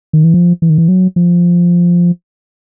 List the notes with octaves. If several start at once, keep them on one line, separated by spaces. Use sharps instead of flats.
D#3
E3
F3
E3
D#3
E3
F#3
F3